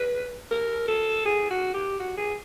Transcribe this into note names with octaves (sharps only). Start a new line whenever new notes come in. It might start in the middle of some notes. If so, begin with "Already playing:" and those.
Already playing: B4
A#4
A4
G#4
F#4
G4
F#4
G#4